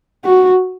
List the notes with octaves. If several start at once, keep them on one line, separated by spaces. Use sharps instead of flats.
F#4